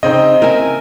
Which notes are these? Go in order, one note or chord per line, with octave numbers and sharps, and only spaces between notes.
C#3 C4 D#4 D#5
A#4 E5 G#5